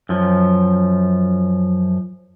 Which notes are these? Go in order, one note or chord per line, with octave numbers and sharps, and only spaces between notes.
F#2 F3